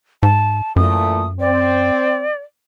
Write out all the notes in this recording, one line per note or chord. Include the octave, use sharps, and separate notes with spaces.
G#2 A5
F#2 A#2 E3 A3 D#6
C4 D5